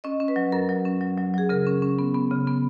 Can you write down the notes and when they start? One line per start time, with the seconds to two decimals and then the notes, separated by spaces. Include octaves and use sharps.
0.04 C#4 D#5
0.20 C#4
0.28 B4
0.36 F#3
0.52 F#2 A#4
0.69 F#3
0.85 C#4
1.01 F#3
1.18 F#3
1.34 F#3 G#4
1.49 C#3 A#4
1.66 C#4
1.82 C#4
1.99 B3
2.14 B3
2.31 C#3
2.47 B3